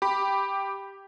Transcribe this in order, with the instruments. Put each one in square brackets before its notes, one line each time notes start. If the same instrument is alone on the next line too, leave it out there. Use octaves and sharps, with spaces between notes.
[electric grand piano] G4 B5